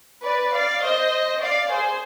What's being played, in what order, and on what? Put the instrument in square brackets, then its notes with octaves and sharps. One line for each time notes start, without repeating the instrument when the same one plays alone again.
[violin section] B4 D5
D5 F5
C5 D#5
D5 F5
G#4 C5